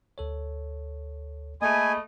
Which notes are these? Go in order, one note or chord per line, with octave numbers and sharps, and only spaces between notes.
D2 A4 C#5
A3 A#3 G#4 D#5 G#5 B5